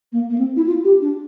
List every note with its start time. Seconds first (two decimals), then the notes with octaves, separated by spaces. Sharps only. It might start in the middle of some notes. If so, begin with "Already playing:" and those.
0.12 A#3
0.30 A#3
0.38 C4
0.56 E4
0.66 F4
0.84 G4
1.01 D4